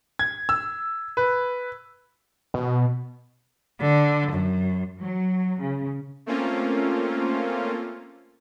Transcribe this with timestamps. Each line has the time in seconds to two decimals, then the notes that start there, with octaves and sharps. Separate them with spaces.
0.19 G#6
0.49 E6
1.17 B4
2.54 B2
3.80 D3
4.31 F#2
5.00 F#3
5.61 C#3
6.26 A3 A#3 C4 C#4 F4